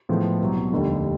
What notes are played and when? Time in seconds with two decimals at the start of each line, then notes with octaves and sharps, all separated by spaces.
0.09 A2 F3 G#3 B3
0.41 C2 B2 F#3
0.72 F1 D#2 D3 G3